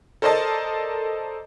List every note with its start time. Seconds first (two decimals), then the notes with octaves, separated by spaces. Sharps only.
0.22 A4 A#4 C5 D5 D#5 A5